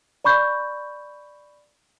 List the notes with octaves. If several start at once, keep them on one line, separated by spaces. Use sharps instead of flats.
D5 B5 C#6 G6